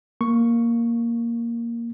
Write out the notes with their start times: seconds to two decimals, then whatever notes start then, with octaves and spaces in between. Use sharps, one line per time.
0.21 A#3 C#6